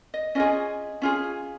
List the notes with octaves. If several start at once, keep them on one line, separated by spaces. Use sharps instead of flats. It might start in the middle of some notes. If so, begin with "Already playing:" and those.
D#5
C#4 F4 G#4 D#5
C#4 F4 G#4